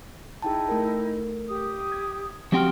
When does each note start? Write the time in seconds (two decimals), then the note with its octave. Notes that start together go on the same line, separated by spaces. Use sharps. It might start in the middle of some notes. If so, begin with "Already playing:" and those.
0.42 D#4 E4 G#4 G5 A5
0.69 A3 A#4
1.48 G4 D#6
1.92 G#6
2.52 F3 C4 F#4 G4 F#5 G5 C6 F6